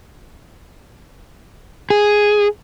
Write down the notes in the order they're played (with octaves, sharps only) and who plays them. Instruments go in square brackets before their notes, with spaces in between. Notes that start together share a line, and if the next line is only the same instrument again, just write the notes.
[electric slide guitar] G#4